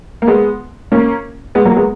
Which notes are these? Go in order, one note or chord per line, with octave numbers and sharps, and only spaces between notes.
A#3
G#3 B3
A#3 C#4
G#3 B3
F#3 A#3
G#3 B3